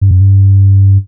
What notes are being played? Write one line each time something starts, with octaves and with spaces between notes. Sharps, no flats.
G2
F#2
G2